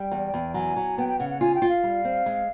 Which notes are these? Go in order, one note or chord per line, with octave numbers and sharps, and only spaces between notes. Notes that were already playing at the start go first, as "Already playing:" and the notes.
Already playing: G3 G5
E2
E2
F#3 G#5
F#3
B3 G5
G5
C#3 F#5
F#5
F4 G#5
G5
F4
F5
G3
C4
G#3